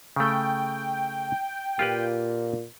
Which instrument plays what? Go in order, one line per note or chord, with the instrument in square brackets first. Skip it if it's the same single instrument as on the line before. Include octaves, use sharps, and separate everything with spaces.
[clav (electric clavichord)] C#3 A3 [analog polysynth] G5
[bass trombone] A#2 [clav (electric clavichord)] F4 G4 B4